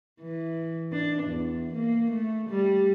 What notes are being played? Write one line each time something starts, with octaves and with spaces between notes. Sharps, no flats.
E3
D4
E2
A#3
A3
G3